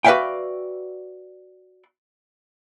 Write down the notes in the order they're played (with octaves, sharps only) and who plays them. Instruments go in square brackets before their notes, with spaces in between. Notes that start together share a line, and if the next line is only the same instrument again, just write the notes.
[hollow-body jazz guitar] F#4 B4 D5 E5 F5 G5